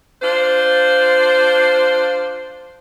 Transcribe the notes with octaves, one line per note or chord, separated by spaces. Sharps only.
D4 F4 C5